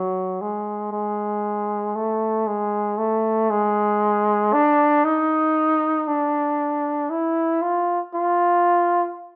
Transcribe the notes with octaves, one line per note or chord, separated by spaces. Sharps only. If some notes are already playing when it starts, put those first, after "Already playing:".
Already playing: F#3
G#3
G#3
A3
G#3
A3
G#3
D4
D#4
D4
E4
F4
F4